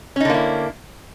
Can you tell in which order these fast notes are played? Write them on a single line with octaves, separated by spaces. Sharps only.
C#4 D#4 D3 A#3 E4